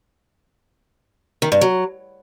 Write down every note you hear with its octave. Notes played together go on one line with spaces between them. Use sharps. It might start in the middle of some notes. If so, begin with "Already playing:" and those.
D#3
G2
F#3